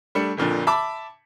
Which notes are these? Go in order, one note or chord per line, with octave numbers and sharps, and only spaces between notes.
G3 A3 D4 C#7
G1 F2 A#2 D3
E5 A5 B5 D6